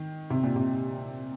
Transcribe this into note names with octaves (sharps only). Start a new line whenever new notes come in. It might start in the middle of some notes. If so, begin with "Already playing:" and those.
Already playing: D#3
C3
A#2
C3